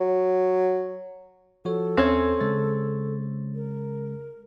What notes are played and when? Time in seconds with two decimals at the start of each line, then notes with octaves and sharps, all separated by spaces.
0.01 F#3
1.65 F3 F#4 A4 C#5
1.97 D#2 C4 C#4 E5 G#6
2.41 C#3 G#3 A6
3.55 A#4